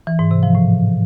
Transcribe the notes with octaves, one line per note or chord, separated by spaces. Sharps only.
E3
G#2
C3
F3
A2